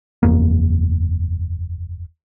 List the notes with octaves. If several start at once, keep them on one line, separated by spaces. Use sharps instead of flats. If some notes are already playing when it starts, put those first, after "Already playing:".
F#1 E2 A#3